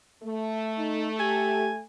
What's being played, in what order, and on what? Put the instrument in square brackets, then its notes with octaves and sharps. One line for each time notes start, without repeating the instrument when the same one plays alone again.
[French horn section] A3
[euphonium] D#4
[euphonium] G4 [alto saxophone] G#5